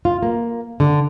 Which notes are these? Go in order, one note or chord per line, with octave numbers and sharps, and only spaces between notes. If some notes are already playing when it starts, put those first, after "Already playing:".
F4
A#3
D3